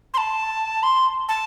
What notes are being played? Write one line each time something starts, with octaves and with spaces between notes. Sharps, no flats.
C6
A5
C6
A5